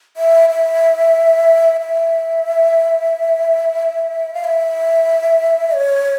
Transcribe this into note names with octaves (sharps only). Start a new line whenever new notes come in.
E5
E5
E5
F5
E5
C#5